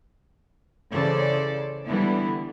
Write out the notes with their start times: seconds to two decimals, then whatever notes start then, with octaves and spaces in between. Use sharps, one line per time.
0.90 C#3 E3 A4 C5 D5
1.86 D3 E3 G3 B3 E4